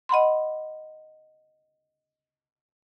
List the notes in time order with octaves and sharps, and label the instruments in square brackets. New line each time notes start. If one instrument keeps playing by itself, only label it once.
[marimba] D#5 F#5 B5 C6